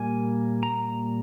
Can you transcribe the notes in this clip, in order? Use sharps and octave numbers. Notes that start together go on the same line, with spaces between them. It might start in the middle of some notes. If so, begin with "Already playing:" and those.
Already playing: A#2 G3 A#3 G#5
A#5